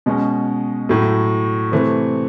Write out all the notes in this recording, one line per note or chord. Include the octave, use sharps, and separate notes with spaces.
B2 G#3 C#4
A2 F#3 A3
C3 E3 A3 C4